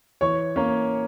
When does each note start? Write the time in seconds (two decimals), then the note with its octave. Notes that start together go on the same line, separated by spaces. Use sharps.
0.21 E3 C#5 C#6
0.56 A#3 C#4